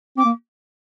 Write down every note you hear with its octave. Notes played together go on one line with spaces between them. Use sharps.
C4 D6
A#3